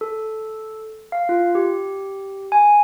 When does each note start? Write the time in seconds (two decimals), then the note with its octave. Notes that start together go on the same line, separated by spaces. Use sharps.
0.01 A4
1.12 F5
1.29 F4
1.55 G4
2.52 G#5